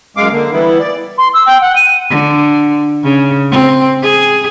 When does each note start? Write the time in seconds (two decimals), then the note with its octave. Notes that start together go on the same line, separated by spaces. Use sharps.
0.17 F#2 G#3 F5 D6
0.32 D3 A#3
0.53 E3 G3 B3 E4
0.79 D5
1.18 C6
1.34 E6
1.46 G5
1.61 F#5
1.76 D#7
2.10 D3
3.03 C#3
3.51 C4
4.02 G#4